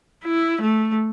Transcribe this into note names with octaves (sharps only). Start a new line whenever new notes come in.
E4
A3